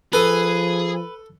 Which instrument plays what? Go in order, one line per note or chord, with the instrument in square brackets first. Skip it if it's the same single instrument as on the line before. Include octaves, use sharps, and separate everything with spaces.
[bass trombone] F3 [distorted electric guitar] G#4 [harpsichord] A4 [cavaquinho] B4